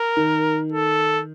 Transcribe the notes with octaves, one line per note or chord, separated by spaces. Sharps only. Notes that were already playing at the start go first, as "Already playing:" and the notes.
Already playing: A#4
D#3
A4